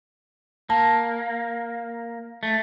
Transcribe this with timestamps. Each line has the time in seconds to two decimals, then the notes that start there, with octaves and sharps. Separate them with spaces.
0.70 A#3 A5
2.43 A3